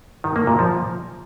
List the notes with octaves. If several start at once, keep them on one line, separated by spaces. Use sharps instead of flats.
D#3
A#3
A#2
F3